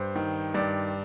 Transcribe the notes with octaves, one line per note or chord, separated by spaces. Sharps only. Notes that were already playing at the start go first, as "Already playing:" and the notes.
Already playing: G2 C5
D#3
G2 D5